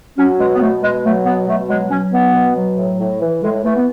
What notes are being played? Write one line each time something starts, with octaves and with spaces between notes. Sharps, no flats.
F#3 C#4
B2 G#3
B3
B2 A3
B2 G#3
F#3 A3
B2 B3
B2 A3
F#3 G#3
F#3 C#4
B2 B3
B2
F#3
A2
A2
E3
A2 G#3
E3 A3
B3